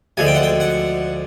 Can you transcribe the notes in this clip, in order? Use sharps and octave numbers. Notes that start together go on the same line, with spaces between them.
D2 D3 F3 G#3 G#5
G5
F#5
G5
F#5